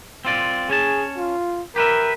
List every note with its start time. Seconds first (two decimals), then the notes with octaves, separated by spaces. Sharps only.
0.25 C4 F4 D5
0.70 C#4 G#4 C#5 A5
1.17 F4
1.76 G4 A#4 B4 E5